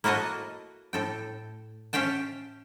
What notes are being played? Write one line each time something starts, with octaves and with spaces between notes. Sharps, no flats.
A#3 E4 F#4 A4 D#5
A2 A4 G5
C#4 E5 F5 G5 A5